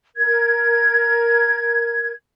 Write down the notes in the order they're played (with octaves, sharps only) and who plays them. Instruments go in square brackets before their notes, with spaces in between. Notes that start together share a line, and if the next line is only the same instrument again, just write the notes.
[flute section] A#4 G#6